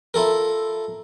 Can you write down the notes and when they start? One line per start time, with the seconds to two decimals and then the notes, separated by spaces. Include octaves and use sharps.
0.14 E4 F4 A4 A#4